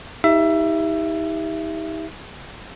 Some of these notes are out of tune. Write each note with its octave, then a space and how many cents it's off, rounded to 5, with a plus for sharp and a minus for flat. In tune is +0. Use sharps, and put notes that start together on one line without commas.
D#4 +40 G4 +15 E5 +20